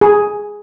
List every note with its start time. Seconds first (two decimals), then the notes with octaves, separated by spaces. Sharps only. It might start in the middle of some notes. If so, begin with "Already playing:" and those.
0.01 G#4